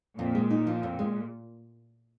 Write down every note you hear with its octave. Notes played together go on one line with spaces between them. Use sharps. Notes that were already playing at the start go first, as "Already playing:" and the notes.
F2 A#2
G#3
D#4
F3
F2
G#3